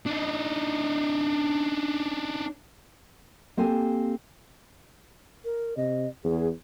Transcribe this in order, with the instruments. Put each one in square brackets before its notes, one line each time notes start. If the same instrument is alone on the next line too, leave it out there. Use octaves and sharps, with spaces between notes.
[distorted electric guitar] D4 D#4
[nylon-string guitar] A#3 C4 G4 A4 G#5
[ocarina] A#4
[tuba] C3 [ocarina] D#5
[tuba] E2 [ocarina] G#4